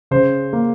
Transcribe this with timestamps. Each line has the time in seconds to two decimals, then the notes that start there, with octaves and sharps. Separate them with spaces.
0.11 C#3 C5
0.53 A#3